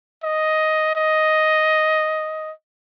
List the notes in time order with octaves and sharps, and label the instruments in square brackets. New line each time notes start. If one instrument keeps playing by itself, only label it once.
[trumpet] D#5
D#5